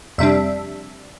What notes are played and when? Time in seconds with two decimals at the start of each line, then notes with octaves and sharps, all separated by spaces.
0.18 F2 C3 G3 D4 E5